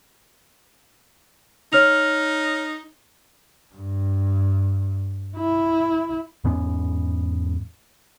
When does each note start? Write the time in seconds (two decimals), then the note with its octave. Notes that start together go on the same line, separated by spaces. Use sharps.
1.73 D#4 C#5 F6 F7
3.75 G2
5.37 E4
6.44 E2 G#2 B3 C#4